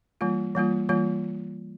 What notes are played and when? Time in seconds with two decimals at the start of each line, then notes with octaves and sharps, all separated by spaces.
0.21 E3 G3 A#3 F4
0.55 E3 G3 A#3 F4
0.89 E3 G3 A#3 F4